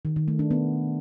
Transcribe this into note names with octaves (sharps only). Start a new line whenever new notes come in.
D#3
D#3
A3
D4
B3